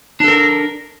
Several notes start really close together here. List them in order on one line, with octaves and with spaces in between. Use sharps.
D4 A4 A#4